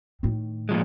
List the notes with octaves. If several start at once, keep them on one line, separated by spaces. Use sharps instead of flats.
A2 D#3
A#2 F3 G#3